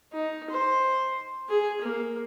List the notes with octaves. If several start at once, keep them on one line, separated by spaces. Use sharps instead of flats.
D#4
C5
G#4
A#3